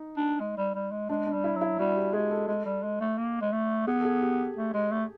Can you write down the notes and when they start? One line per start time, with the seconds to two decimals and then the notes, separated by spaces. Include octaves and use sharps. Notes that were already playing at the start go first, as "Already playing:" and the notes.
Already playing: D#4
0.17 D4
0.40 G#3
0.57 G3
0.75 G3
0.91 G#3
1.09 G#3 D4
1.26 D4
1.33 G3
1.44 E4
1.56 F#3
1.61 E4
1.79 G3 F#4
1.96 G4
2.13 G#3 G#4
2.31 A4
2.48 G#3
2.65 G3
2.83 G#3
3.00 A3
3.18 A#3
3.41 G#3
3.52 A3
3.87 B3 G#4
4.00 A4
4.05 G#4
4.22 G4
4.56 A3
4.74 G#3
4.91 A3